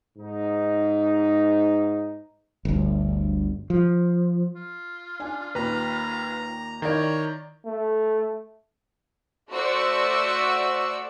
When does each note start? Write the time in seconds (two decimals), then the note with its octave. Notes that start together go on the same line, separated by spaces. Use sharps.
0.17 G#2 D#4
2.65 G1 D2
3.70 F3
4.56 F4
5.20 D4 G#5
5.55 D#2 A#2 B4 A#5
6.82 D#3 E4 C#5 D5 A#5
7.65 A3
9.51 A3 F#4 C5 D5 E6 C#7